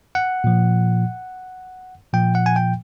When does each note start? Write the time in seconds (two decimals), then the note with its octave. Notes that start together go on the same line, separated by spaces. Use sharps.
0.15 F#5
0.44 A#2 F3
2.13 A#2 F3 G5
2.35 F#5
2.46 G#5
2.56 G5